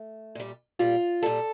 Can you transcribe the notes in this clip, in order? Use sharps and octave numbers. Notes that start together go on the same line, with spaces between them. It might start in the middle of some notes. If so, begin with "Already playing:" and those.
Already playing: A3
A#2 G3
A#2 G3 F4
A#2 G3 A4